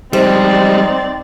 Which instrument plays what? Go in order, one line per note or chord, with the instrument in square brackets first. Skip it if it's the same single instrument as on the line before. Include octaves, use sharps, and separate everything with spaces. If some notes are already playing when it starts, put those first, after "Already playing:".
[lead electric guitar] G3 G#3 [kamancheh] C4 D5 [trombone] D#4 [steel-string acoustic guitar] C5